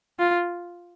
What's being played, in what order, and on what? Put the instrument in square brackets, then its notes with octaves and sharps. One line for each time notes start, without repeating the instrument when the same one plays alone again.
[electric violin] F4